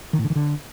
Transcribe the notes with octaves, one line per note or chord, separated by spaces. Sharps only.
D#3
A2
D3
D#3
D3